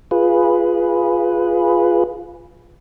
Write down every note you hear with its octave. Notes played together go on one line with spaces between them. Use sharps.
F4 G#4 B4